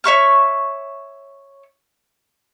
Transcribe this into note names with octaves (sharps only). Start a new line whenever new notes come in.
C#5 E5 C#6 F6